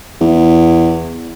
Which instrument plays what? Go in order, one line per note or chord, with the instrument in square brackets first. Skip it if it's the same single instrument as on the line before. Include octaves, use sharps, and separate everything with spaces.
[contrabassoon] E2